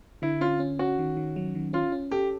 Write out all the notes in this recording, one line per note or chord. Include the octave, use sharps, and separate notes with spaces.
D3 E4
C#4 F4
C#4
C#4 F#4
D#3
D#3
F#3
D#3
C#4 F4
C#4
G4 A4